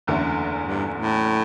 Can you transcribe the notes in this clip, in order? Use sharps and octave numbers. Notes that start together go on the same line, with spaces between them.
F#1 E2 D3 A3
G2
A2